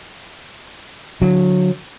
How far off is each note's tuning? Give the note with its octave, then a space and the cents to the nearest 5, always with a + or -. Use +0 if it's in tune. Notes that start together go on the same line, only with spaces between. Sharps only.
D3 +0 F#3 -20